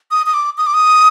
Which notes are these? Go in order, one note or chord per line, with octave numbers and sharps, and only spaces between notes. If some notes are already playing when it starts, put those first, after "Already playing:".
D#6
D#6
D6
D#6
D6
D#6